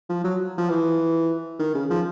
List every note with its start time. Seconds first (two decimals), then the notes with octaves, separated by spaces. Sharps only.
0.09 F3
0.24 F#3
0.58 F3
0.70 E3
1.59 D#3
1.75 C#3
1.90 F3